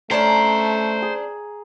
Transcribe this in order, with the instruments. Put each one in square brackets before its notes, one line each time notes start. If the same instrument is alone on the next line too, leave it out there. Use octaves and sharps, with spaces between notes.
[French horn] A3 [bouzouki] C#4 D4 A5 [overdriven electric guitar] C5 [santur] A#5
[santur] G#4